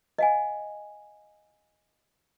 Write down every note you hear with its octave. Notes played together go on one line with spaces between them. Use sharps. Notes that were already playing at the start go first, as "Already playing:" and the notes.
D#5 F5 G#5